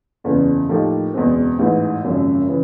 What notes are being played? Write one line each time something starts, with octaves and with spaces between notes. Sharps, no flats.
F#1 E2 C#3 E3
A2 F3 A#3 D#4 G4
F#1 E2 B2 G#3 C4
A1 G#2 E3
G#1 F#2 C#3 F3 A#3
C#3 E3